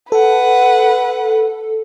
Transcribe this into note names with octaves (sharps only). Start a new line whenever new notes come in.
A4 B4 F#5